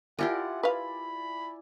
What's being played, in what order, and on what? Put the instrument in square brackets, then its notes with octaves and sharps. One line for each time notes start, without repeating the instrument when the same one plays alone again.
[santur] E4 D5 G#5 [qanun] F4 G4 A#4 [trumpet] F#5
[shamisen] B4 F5 [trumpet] B5